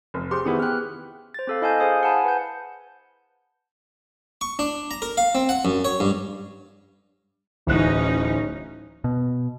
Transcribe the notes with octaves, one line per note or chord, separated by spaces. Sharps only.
F1
G4 G#4 C5 C6
D#3 B3 E4 G#4
B3 G4 F6 F#6
C5 A6
C4 A4 F5
E4 D#5 F5 G#5 A5 G6
G#4 C5 F5 G#5 D#6
F#5 G#5 A5 B5
B4 F#5 G6
C#6
D4
A#5
A#4
F5
C4
F#5
F#2
C#5
G2
D1 E3 C#4 D#4 F#6
B2